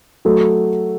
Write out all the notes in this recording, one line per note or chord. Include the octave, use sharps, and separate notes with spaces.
F#3 A3